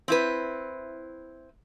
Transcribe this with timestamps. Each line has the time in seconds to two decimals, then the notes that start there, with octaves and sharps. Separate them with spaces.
0.08 C4 E4 B4